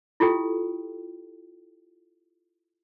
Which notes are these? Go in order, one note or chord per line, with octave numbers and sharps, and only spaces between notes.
E4 F4 G4 A4 G5